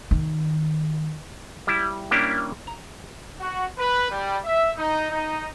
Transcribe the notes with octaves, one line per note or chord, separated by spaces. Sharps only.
D#3
G3 E4
G3 A#3 C#4 D4 E4 G4
A#5
F#4
B4
G3
E5
D#4
D#4